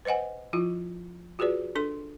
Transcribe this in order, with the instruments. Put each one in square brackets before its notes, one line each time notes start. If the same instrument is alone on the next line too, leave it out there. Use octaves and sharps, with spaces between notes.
[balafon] B4 C5 D#5 F#5 G#5
F3 E4 F4
F4 F#4 G#4 B4 D5
D4 A4 C6